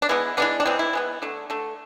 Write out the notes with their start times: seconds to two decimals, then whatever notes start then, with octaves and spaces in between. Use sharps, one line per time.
0.02 D4
0.09 E3 G#3 B3 E4
0.37 E3 G#3 B3 D4
0.60 D4
0.66 E3 G#3 B3 C4
0.79 E4
0.93 E3 G#3 B3
1.22 D3 A3
1.50 D3 A3